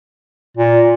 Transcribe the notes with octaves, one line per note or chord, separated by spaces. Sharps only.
A#2